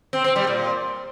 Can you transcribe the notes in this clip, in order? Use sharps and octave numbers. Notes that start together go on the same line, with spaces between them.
C4
C4
G3
A#2